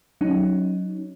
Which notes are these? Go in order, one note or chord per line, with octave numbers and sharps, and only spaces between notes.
F#3 C#4 D#4